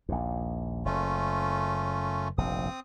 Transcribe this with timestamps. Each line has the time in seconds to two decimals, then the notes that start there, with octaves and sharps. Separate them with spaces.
0.09 A#1 D#2
0.85 F#1 A3 C#4 F4
2.38 F1 A#1 G2 C4 D#6